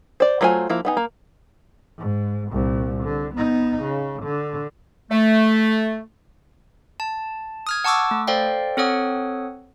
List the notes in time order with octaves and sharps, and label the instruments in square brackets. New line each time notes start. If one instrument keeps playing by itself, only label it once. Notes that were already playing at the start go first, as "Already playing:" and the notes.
[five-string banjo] C5 D5
F#3 A3 F4 C5 G#5
F3 A#3 E4
B3 D#4 G#5
A#3
[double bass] G#2
C2 A#2
D3
B3 D#4
C#3
D3
[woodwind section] A3
[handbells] A5
D#6 F6 G#6
F#5 A5 C#6 D6 E6
A3
A4 C5 D5 F5 G5
C4 A4 C#5 F#5 D#6